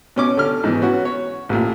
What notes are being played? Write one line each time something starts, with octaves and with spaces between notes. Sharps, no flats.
B2 C#4 D6
D3 F6
G#2 B2 E3
B3 C#4 F#4
C#5
A1 A#2